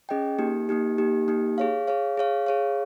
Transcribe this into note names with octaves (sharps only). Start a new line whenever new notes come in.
C#4 G#4 D#5 G5
A#3 D#4 G4
A#3 D#4 G4
A#3 D#4 G4
A#3 D#4 G4
G#4 C#5 F5
G#4 C#5 F5
G#4 C#5 F5
G#4 C#5 F5